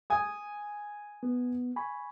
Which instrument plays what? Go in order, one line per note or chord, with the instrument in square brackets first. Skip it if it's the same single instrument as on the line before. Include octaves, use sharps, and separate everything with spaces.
[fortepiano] G#5 D#6
[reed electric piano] B3
G#5 B5 C#6